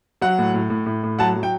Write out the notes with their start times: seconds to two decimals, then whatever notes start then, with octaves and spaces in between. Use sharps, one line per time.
0.21 F#3 F#5
0.39 A2
0.54 A2
0.70 A2
0.86 A2
1.03 A2
1.19 F#3 F#5 A5
1.35 F#3
1.43 G5